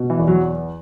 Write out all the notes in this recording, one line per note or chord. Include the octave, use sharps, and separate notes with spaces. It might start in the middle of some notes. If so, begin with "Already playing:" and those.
Already playing: B2
E3
E2
F#3